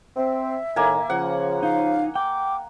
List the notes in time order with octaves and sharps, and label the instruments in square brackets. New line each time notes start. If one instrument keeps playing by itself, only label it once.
[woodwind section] C4 [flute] E5
[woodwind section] A2 D#3 [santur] A#3 G#5
[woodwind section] C#3 F3 [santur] F#5
[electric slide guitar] D#4 [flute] F5
[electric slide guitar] G5 [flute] D6